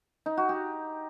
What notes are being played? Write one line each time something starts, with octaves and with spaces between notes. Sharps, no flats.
D#4
F#4
G4